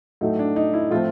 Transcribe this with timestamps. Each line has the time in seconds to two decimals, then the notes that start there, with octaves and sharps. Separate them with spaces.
0.21 A2 F#3 A3 D#4
0.39 D4
0.56 D#4
0.73 E4
0.91 A2 F3 A3 C4 F4